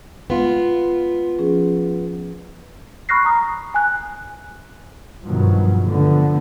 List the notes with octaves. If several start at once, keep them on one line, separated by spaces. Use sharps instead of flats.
G#3 B3 F4
F3 C#4 G#4
B5 C#6 F6 F#6 A#6 C7
A#5 D#6
G#5 F#6
G2 B2 D#3 F3 F#3
D3 F3 A3 B3